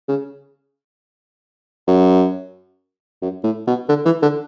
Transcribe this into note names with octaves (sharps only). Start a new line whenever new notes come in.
C#3
F#2
F#2
A2
B2
D3
E3
D3